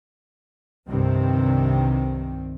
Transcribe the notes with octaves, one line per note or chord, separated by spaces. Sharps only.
C2 G2 C3 D#3 C4